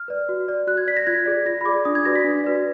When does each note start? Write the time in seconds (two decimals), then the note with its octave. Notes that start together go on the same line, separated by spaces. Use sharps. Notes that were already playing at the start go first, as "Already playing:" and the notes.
Already playing: F6
0.08 B4 D5
0.29 F#4
0.48 D5
0.67 F#4 F#6
0.77 G#6
0.87 D5 B6
0.97 A#6
1.07 F4 G#6
1.26 G#4 D5
1.46 F4 A#6
1.61 B5
1.65 G#4 D5 D6
1.85 D4 D#6
1.95 G#6
2.05 F#4 B4 D5 A#6
2.15 B6
2.24 D4
2.44 F#4 B4 D5